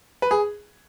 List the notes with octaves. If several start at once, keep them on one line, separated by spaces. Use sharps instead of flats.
B4
G#4